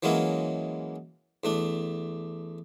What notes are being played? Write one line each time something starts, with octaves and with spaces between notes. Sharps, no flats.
E3 F#3 G#3 A#3 C#4 E4
E2 A3 D4